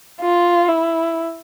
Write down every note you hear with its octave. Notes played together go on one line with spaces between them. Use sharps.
F4
E4